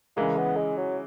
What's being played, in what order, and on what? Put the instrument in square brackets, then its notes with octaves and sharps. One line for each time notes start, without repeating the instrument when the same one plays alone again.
[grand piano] C#3 E3 G#3 [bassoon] A#3
[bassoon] B3
G#3
F#3